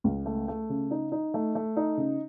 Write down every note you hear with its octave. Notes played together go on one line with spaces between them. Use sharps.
C#2
A3
A3
C#3
D#4
D#4
A3
A3
D#4
C#3